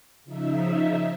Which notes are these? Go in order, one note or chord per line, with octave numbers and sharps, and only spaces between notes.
C#3 F3 D#4 E5